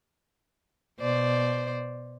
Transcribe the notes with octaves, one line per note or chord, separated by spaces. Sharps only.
B2 C5 D5